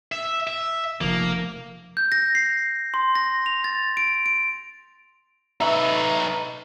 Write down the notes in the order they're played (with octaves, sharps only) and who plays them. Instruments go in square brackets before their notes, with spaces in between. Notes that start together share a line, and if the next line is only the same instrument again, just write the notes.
[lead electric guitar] E5
E5
[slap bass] F1 F3 [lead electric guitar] A#3
[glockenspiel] G6
A#6
C7
C6
A#6
F7
A6
D7
D7
[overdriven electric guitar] D#4 B4 [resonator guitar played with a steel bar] E5